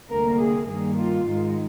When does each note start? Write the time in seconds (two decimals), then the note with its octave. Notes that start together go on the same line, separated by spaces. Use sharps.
0.10 D2 C3 G3 A#3 A#4
0.39 G#4
0.66 G2 D#3 A#3 G#4
0.95 F4
1.23 G#2 D#3 G#3